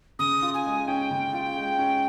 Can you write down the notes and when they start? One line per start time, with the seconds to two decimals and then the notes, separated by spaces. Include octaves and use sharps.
0.19 C#3 D#6
0.42 F4
0.54 G#5
0.66 G#3
0.87 C#4 G5
1.11 C#3
1.33 F4
1.57 G#3
1.78 C#4